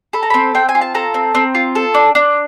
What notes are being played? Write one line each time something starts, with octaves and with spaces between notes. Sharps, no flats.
A4 B5
A#5
C4 B5
C4 G5
G#5
F4
A5
A4 A#5
C4
C4
F4
A4
D4
D4